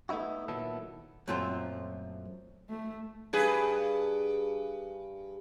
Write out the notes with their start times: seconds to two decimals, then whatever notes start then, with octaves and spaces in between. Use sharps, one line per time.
0.09 A3 B3 D#4 E4 F#4
0.48 A#2 D#3 F#3 B3 E4 A4
1.28 F#2 A#2 F3 A3 C4 C6
2.70 A3
3.33 G2 G#4 B4